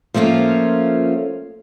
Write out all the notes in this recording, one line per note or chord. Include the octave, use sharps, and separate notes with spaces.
F3 A3 A#3 C#4 F4